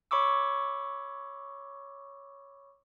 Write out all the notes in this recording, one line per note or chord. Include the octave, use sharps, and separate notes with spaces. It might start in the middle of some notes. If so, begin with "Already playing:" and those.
C#5 B5 C#6 D6 E6